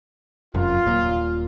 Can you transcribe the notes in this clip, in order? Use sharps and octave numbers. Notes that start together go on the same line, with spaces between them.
F1 F#2 F4
D#1 A#2